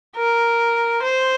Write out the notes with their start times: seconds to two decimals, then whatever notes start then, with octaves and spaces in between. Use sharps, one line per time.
0.16 A#4
1.03 C5